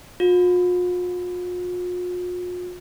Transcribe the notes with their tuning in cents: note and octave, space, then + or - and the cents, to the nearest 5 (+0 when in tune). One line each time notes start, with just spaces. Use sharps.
F4 +45